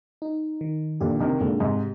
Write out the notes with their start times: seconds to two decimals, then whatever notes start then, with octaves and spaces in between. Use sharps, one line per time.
0.22 D#4
0.61 D#3
1.01 A#2 D3 G4
1.20 C3 D#3
1.40 A#2 D3 G#3
1.60 G#2 C3